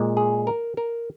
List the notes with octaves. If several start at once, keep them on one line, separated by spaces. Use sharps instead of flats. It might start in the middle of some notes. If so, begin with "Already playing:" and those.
Already playing: A#2 G#3
G#4
A#4
A#4